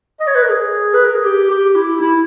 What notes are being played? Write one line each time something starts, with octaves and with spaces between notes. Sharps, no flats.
D#5
C#5
B4
A#4
G#4
B4
A#4
G#4
G4
G4
E4
E4